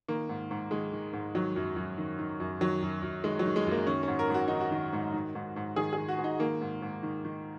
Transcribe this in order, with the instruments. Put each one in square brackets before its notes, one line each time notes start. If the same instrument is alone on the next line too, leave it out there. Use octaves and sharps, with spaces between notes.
[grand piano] D#3 A#3
G#2
G#2
D#3 G#3
D#3
G#2
D#3 F#3
F#2
F#2
D#3
D#3
F#2
D#3 F#3
F#2
F#2
D#3 G#3
F#3
D#3
G#3
F#2 A#3
D#3 C#4
G#2 C#4
A#4
G#2 F#4
D#3 D#4
F#4
D#3
G#2
D#3
G#2
G#2
D#3 G#4
D#3 G#4
F#4
G#2
D#4
D#3 A#3
G#2
G#2
D#3
D#3